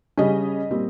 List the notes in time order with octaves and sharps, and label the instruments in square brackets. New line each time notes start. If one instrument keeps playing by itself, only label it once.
[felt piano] C#3 G3 C#4 D#5
A#2 G3 C4